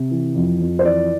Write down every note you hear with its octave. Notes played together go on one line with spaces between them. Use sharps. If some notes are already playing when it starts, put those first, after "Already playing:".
Already playing: C3
E3
F2
F2
C5
E3 D5